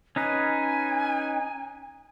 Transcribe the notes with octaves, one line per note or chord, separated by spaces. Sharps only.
C#4 D#4 B4 G#5